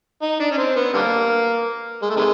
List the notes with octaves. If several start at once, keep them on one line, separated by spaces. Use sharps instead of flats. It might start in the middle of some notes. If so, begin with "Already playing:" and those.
D#4
D4
C#4
C4
B3
D3 G3 A#3
G#3
A3
C3 D#3 G#3